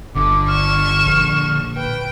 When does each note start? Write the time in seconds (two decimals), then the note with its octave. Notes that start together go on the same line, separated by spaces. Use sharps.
0.15 G1 D3 D6
0.48 C#6 F6 E7
1.06 A#1
1.76 B4 G5